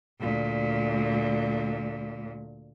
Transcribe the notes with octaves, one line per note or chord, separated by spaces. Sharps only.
D2 A#2